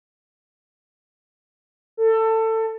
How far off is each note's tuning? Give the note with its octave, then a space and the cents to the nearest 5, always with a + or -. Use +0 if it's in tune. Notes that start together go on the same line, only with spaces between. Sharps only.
A4 +20